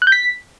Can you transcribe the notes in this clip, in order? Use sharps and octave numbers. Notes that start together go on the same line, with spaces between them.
F#6
G6
B6